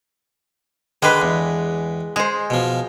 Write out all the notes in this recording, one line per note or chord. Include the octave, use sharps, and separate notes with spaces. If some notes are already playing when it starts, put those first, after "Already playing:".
D3 D#3 G#3 G4 B4 D#5 B5
E2
G#3 G#4 C5
B2 F3